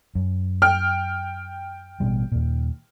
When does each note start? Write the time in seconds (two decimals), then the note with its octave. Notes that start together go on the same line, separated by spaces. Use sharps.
0.15 F#2
0.62 G5 F6
2.00 A1 B2 G3
2.32 D#2 A#2